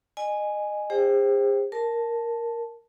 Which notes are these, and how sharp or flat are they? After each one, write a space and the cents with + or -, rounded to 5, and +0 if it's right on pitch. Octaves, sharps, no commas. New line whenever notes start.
D#5 -25 G#5 +0
G#4 -45 C5 +15 G5 +0
A#4 +0 A5 +0